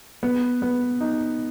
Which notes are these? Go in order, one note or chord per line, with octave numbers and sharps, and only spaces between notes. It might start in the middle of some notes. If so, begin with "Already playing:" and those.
B3
B3
D#4